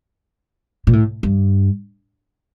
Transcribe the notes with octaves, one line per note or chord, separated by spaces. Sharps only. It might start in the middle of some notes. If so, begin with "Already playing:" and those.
A#2
A2
G2